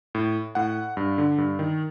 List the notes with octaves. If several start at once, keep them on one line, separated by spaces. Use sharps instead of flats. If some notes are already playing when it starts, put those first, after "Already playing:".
A2
A2 F#5
G2
D3
G2
D#3